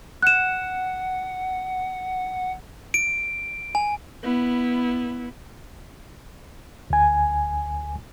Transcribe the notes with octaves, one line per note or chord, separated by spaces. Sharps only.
F#5 F#6 E7
D7
G#5
B3 E4
D2 G#5